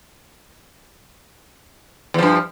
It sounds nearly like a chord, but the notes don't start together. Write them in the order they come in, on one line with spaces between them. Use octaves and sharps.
E2 F3 G2